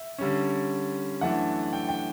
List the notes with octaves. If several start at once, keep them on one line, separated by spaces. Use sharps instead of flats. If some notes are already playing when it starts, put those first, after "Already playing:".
Already playing: E5
D3 G3 C#4
F#2 E3 A3 D4 F#5
G5
G5